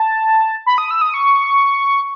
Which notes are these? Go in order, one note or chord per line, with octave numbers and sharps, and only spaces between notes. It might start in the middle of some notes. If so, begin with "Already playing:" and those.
Already playing: A5
B5
D#6
E6
D#6
C#6